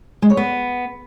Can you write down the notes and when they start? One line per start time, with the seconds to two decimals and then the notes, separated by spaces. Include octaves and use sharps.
0.22 G#3
0.30 C#5
0.37 B3